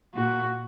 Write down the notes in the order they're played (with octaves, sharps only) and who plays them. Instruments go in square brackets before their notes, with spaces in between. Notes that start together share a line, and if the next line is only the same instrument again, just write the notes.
[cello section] A#2 [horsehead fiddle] F#4